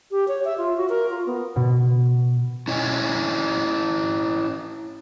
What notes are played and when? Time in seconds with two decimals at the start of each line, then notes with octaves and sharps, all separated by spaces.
0.11 G4
0.28 C#5
0.45 E5
0.58 F4
0.77 F#4
0.89 A#4
1.10 F4
1.26 B3
1.56 B2
2.68 C#4 E4 C#5 D#5 F5 G#5